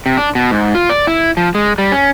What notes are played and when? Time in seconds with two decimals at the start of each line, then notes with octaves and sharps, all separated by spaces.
0.06 C3
0.17 D4
0.35 B2
0.51 G#2
0.75 F4
0.90 D5
1.07 E4
1.37 F3
1.55 G#3
1.78 G3
1.92 C#4